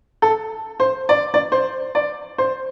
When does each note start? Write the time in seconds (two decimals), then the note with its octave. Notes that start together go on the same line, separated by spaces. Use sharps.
0.22 A4
0.80 C5
1.09 D5
1.34 D5
1.52 C5
1.95 D5
2.38 C5